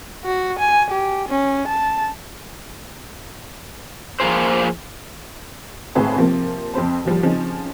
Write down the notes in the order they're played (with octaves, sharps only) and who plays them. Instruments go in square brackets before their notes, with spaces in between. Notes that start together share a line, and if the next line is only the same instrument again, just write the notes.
[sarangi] F#4
G#5
G4
C#4
A5
[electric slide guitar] F3 A#3 F4 G#4 C5
[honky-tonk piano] G#1 A2 C4 G#4 B4 A5
C3 F3 A#3 C4
F2 C4 C5 A5
D#2 F3 G3
C#3 F3 C4 C#4 D#4